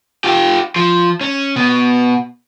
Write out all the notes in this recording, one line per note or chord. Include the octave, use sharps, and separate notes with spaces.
F4 G4
F3
C#4
B2